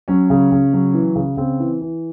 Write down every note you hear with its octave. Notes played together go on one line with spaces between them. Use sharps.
F#3 C#4
C#3
C#3
F#3
E3
C#3
C#3 C4
E3
E3